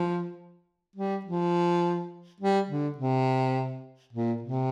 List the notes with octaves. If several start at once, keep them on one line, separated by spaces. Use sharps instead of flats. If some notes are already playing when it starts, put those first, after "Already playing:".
Already playing: F3
G3
F3
G3
D3
C3
A#2
C3